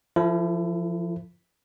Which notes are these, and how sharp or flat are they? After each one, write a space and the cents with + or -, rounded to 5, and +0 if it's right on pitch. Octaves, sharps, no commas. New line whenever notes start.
F3 -15 E4 +25 A4 +25